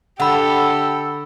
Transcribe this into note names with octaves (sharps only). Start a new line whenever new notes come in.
D3 G4 A4 E5 F#5 B5 E6